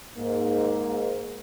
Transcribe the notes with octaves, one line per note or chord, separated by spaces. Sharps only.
G#2 A#3